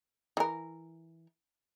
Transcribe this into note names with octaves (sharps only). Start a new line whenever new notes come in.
E3 A#4